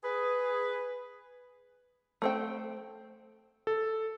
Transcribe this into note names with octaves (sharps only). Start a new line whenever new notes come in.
G#4 B4
A3 C4 G5
A4